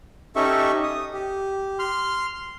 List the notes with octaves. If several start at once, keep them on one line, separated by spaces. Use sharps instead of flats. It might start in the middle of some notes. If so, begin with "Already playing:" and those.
C#4 D#4 G4 A4 E5 C#6
D#6
G4
C6 F6